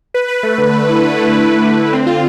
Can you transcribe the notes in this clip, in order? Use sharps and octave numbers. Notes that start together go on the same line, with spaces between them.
B4
B4
A3
D3
A3
E4
D3
A3
A3
B4
D3
D3
C4
F4